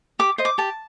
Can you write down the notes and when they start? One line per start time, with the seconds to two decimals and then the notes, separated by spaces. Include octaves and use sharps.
0.19 G4 D6
0.38 C5 D#5
0.45 D6
0.58 G4 A5